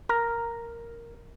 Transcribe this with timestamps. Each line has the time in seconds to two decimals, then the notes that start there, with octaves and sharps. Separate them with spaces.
0.09 A#4